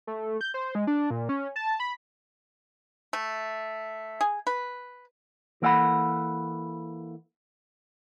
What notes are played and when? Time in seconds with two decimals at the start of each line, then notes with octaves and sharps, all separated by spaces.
0.07 A3
0.41 G6
0.54 C5
0.75 G#3
0.87 D4
1.10 A#2
1.29 C#4
1.56 A5
1.80 B5
3.13 A3
4.21 G#4
4.47 B4
5.62 E3 A#3 A4 F5 F#5 B5